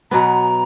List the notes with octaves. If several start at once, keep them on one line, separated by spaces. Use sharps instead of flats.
B2 F#3 B3 A#5